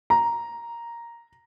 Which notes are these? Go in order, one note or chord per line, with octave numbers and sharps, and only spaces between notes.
A#5